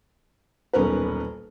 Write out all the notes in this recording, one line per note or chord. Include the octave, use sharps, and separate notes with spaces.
D#1 B1 C#4 A#4 B4